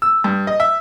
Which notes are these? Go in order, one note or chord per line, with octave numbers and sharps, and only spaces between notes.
E6
G2
D#5
E5